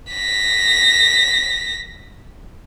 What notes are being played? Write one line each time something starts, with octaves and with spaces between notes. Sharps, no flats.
A#6 B6